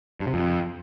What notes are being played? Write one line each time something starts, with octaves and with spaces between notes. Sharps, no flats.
G2
C3
F2